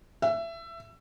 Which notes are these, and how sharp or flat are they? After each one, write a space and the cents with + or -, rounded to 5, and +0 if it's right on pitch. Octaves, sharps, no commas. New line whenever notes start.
E5 +20